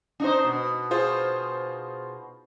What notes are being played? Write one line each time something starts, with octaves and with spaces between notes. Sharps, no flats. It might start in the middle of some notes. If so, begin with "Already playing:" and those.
D4 D#4 C5
B2
F4 G#4 C5